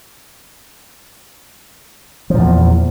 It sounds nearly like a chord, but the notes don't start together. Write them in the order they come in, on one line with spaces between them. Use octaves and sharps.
F3 A#2 E2